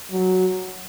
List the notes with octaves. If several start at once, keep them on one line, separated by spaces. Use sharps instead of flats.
F#3